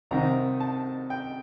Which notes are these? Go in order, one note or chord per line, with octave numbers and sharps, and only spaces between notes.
C2 C3 D#3 A#5
A5
G5